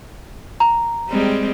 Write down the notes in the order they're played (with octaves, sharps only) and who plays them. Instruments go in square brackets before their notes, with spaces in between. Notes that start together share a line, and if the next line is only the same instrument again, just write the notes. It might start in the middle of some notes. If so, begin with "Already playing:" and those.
[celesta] A#5
[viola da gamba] G3 G#3 C4